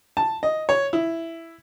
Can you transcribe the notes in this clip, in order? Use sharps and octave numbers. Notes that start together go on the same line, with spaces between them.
A5
D#5
C#5
E4